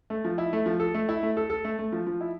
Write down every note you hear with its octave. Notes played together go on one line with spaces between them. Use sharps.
A3
F3
E4
A3
F3
A4
A3
E4
A3
A4
A4
A3
A3
F3
F3
E4